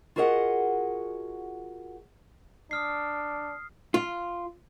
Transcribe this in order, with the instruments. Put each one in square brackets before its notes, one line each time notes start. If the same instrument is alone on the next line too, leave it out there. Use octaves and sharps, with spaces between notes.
[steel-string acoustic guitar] F4 F#4 G#4 A#4 D#5 F#5
[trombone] D4 [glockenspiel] D#6 F6 C7
[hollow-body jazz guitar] F4